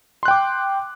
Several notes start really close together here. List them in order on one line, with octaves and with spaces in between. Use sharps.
C6 F#6 G5 D6